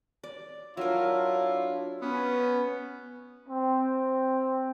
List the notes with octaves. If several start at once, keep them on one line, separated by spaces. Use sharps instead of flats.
D5
F#3 D4 E4 F4 A#4
B3 C#4
C4